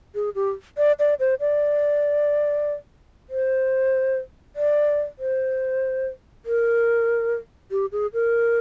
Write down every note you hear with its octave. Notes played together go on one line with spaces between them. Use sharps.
G#4
G4
D5
D5
C5
D5
C5
D5
C5
A#4
G4
G#4
A#4